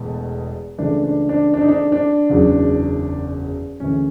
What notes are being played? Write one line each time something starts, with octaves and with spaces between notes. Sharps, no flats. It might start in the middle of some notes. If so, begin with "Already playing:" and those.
Already playing: E1 E2 B2 A3
C#2 C#3 E3 A3 D4
D4
D4
D4
D#4
D4
D4
F#1 E2 C#3 F#3
D2 C#3 E3 C#4